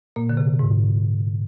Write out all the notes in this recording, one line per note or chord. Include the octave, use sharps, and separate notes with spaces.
A#2 A#3
D3
C3
G#2